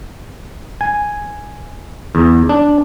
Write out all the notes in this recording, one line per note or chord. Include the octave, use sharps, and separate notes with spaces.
G#5
E2
D4